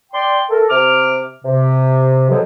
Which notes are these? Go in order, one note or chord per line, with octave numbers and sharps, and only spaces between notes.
D5 G5 C6
A4 A#4
C3 D6 F6
C3
G#2 B2 D3 F3 F#3